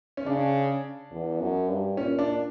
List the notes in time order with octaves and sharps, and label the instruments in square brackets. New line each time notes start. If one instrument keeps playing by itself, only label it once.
[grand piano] C#4
[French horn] C#3 [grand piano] D4
[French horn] E2
F#2
G2
[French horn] A#2 [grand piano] C#4
[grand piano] D4